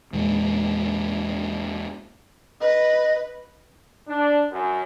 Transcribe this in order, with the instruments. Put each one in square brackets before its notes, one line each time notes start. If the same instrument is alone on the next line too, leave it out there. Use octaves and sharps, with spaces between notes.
[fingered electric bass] E2 A#2 G#3
[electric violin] B4 [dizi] D#5
[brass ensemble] D4
F#2